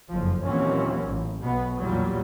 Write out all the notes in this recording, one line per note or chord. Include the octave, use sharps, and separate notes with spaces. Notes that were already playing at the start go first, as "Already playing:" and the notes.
F#1 F2 F3
D#2 A#2 E3 F#3 C4 C#4
A1
B1 B2 B3
E2 A#2 F#3 G3